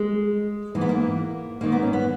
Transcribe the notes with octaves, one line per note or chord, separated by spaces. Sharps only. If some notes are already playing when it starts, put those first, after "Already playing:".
Already playing: G#3
G#2 E3 A#3
B3
A#3
G#2 D#3 A#3
B3
C#4
B3